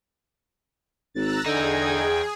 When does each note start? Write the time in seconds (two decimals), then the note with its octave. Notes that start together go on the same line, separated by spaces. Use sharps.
1.15 G#1 A#5 E6 F#6 A6
1.46 E2 D3 D#4 G#4 G5 G#6